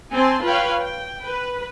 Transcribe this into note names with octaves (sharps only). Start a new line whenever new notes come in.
C4 G#5 A5 C6
F4 B4 C#5 F5 G5
G5
B4